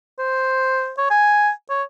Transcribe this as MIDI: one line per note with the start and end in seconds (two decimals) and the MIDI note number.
0.19 0.93 72
0.98 1.08 73
1.11 1.50 80
1.70 1.83 73